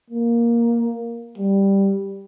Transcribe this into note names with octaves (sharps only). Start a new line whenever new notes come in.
A#3
G3